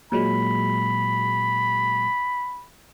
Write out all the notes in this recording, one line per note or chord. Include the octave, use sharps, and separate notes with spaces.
A#2 F#3 G#3 B5